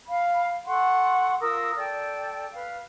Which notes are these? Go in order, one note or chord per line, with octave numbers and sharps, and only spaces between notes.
F5 B5
A4 F#5 C6 C#6
F4 A#4 D#6 E6
A4 D5 G5
B4 F5